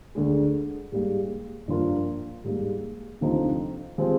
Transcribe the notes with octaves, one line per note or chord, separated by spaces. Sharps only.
D2 D3 G#3
G#2 G3 A#3
G2 F3 A#3 F4 A#4
G#2 G3 A#3
D2 C3 F3 C4 D#4
F3 G#3 C4 G4